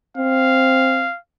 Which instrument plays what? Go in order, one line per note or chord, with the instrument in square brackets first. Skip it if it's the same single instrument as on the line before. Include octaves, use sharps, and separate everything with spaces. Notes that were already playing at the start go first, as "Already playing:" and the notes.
[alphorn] C4 [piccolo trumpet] F5